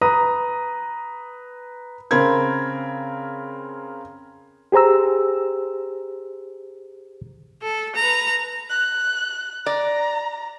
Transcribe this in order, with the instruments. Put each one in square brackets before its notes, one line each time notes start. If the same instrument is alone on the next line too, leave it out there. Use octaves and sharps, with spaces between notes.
[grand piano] B4 A#5 D#6
[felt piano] C#3 C4 A#4 B5 G#6
[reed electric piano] G4 G#4 C5 A#5 E6
[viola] A4
B4 A#5
[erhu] F#6
[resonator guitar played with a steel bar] D5 [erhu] A#5